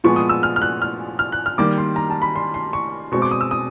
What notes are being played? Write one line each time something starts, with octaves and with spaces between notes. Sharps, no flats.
A#2 F3 G#3 B3 C#6
D#6
E6
F6
F6
F#6
F6
F6
F#6
F6
D#3 G3 A#3 D6
C6
A#5
A5
B5
C6
C6
C#6
B2 G#3 C4 C#6
D6
D#6
E6
D#6